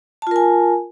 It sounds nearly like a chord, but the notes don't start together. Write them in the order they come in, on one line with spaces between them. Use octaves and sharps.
A5 F4 A#4 G#5